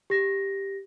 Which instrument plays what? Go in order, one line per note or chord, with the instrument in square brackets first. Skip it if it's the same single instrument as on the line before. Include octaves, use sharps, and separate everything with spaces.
[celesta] G4 A#6